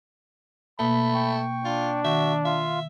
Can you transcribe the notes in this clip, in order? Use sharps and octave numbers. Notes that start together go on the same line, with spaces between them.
B2 A3 A#3 B5
G5 C#6
D4 F4
D#3 F#4 E5
F4 E5 F5